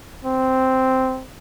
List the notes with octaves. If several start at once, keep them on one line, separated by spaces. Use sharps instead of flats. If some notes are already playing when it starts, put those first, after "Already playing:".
C4